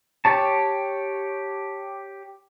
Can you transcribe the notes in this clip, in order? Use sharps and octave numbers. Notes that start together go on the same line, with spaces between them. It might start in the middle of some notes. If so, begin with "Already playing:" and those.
G4 C#5 A5